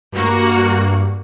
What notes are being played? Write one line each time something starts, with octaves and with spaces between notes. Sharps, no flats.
G2 A#3 F#4